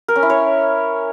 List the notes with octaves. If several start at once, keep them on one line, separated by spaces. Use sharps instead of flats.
A#4
C#4
E4
C#5